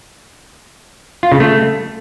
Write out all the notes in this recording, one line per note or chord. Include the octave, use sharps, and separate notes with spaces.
F4
C#3
A3